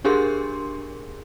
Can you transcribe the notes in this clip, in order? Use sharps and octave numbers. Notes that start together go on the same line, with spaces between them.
D4 G4 G#4 A#4 C6